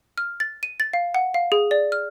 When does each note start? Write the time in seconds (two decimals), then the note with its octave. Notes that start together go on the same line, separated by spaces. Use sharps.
0.18 F6
0.40 A6
0.63 D#7
0.80 A6
0.93 F5
1.15 F#5
1.34 F5
1.52 G#4
1.71 D5
1.92 F6